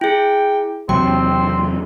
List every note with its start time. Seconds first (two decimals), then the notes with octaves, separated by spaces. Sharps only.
0.01 E4 G#4 G5
0.89 E2 C3 F#3 C4 G5